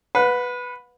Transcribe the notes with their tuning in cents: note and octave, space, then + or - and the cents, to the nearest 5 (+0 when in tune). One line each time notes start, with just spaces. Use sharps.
B4 +0 F#5 -35